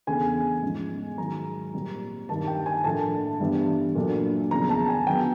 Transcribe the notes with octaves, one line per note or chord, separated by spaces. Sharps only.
E2 C#3 E3 A3 D4 G#5
G#2 F3 G#3 C#4
G#2 D#3 F#3 A#5
A#2 G3 C4
G2 D#3 G3 A#3 A5
G5
G#5
A2 F3 A#3 D4 A5
G2 E3 G3 B3 D4
A#2 F#3 A3 D4
E2 C#3 F3 A#5
A5
G#5
D3 F#3 B3 G5